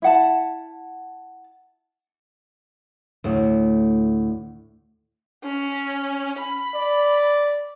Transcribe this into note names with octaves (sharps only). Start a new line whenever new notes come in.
E4 F#5 A5
D2 A2
C#4
B5
D5